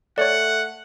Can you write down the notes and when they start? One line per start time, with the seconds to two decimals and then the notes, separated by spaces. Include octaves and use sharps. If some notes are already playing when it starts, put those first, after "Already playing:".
0.18 A3 C#5 D5 F#5